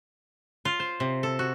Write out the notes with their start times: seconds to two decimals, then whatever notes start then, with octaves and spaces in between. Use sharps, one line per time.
0.65 F4
0.80 C5
1.00 C3
1.23 A4
1.39 F#4